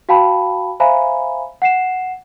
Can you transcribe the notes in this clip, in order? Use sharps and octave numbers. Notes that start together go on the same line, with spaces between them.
F#4 F5 G5 A5 B5
C5 E5 F5 G#5 A#5 B5
F#5 C7 E7